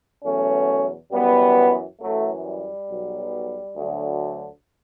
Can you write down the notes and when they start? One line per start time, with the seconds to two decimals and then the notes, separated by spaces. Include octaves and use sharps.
0.24 E2 B2 F#3 A3 C#4
1.11 F#2 E3 G3 B3
2.00 F#2 E3 F#3 A3
2.43 G3
2.88 B1 B2 F#3
3.75 D2 D3 F#3